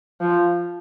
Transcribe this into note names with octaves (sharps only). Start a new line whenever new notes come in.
F3